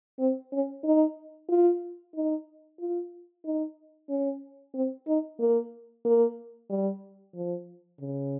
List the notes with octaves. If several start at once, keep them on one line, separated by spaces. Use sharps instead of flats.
C4
C#4
D#4
F4
D#4
F4
D#4
C#4
C4
D#4
A#3
A#3
G3
F3
C#3